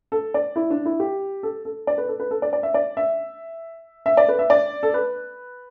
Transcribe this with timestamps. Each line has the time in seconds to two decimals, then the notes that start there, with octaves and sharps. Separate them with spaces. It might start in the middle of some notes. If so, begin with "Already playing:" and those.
0.12 A4
0.34 D5
0.56 E4
0.70 D4
0.85 E4
1.00 G4
1.43 A4
1.65 A4
1.87 D5
1.98 B4
2.08 A4
2.20 B4
2.31 A4
2.42 D5
2.53 D5
2.63 E5
2.74 D5
2.97 E5
4.06 E5
4.17 D5
4.29 B4
4.39 E5
4.50 D5
4.83 A4
4.94 B4